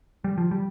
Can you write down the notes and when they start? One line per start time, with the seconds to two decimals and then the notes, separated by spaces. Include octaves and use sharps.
0.24 G3
0.38 F3
0.51 G3